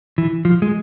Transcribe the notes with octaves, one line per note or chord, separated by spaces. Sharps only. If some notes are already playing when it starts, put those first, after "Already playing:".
E3
F3
G#3